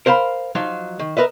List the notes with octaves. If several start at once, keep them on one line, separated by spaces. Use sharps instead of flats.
A#4 C5 F5 A#5 B5
F3 F#3 D#4
D#3
A#4 B4 D#5 E5